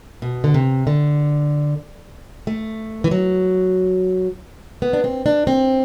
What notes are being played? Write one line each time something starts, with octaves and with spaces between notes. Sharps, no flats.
B2
D3
C3
D3
A3
E3
F#3
B3
D4
C4
D4
C4